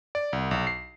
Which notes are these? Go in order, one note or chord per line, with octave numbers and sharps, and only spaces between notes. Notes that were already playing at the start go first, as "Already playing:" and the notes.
D5
C2
B1
C7